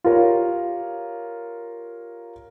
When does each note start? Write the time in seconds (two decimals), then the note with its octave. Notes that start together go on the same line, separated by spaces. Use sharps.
0.04 F4 G4 A#4 C#5